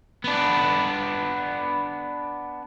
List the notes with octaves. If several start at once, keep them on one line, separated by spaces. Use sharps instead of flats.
B3 D4